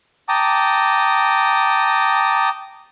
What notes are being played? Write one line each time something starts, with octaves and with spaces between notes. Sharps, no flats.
G5 A5 A#5 D6 D#6